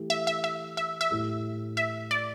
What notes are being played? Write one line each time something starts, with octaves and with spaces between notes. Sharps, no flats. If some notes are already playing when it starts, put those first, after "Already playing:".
Already playing: E3 A3 E4 G4
E5
E5
E5
E5
E5
A2 A3 E4 G4
E5
D5